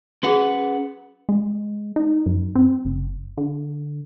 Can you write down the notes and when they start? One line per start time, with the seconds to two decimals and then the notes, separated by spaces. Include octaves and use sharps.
0.23 C#4 F#4 G#4 B4 F#5
1.29 G#3
1.96 D#4
2.26 F#2
2.55 C4
2.85 F#1
3.37 D3